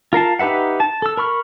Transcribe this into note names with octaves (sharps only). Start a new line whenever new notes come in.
F4 A#4 F5 A5
D#4 G4 B4 E5 F#5
A5
A4 E6
A#4 B5 C#6 F6